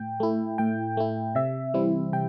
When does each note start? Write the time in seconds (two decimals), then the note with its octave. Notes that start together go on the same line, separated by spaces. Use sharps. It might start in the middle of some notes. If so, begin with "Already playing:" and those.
Already playing: A2 G5
0.20 A3 E4
0.58 A2 G5
0.97 A3 E4
1.35 C3 E5
1.74 E3 G3 C4 E4
2.12 C3 G5